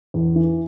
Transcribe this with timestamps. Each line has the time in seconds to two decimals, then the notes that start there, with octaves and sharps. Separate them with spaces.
0.14 E2
0.36 E3